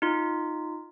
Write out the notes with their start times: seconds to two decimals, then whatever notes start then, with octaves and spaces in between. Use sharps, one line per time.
0.02 D#4 F4